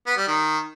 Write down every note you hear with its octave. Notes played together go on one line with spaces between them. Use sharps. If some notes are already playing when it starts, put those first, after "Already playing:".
B3
G3
D#3